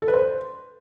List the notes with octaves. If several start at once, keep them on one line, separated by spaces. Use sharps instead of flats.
A4
B4
C5